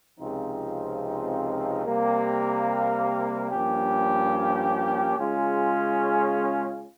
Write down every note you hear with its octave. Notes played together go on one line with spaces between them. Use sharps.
C#2 C3 F3 C4 D#4
C3 G3 A#3
G2 F3 A#3 C#4 G4
C#3 G#3 C#4 F4